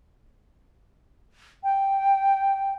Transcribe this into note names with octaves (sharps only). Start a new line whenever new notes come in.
G5